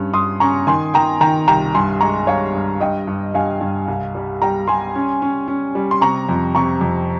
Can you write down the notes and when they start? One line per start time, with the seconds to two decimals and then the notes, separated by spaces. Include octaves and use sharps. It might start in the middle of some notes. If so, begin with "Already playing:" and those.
Already playing: G2 C#4
0.14 G2 C6 D#6
0.40 C#4 A#5 C#6
0.67 D#3 G#5 C6
0.94 D#3 G5 A#5
1.21 D#3 G5 A#5
1.47 C2 G5 A#5
1.74 G2 G#5 C6
2.01 G#3 A#5 C#6
2.27 G2 C#5 F5
2.55 G2
2.81 G2 D#5 G5
3.07 G2
3.34 G2 F5 G#5
3.61 G2
3.88 C2
4.15 G3
4.42 G3 G5 A#5
4.68 G3 G#5 C6
4.95 C#4
5.22 C#4
5.48 C#4
5.75 G3
5.91 C6
6.01 C3 A#5 C#6
6.29 F2
6.55 C3 A#5 C#6
6.81 F2